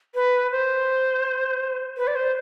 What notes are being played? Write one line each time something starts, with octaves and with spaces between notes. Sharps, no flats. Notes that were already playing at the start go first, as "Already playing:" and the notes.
B4
C5
B4
D5
C5